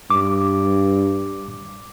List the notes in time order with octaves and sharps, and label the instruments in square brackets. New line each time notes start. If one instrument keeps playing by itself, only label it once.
[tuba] G2 [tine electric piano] D6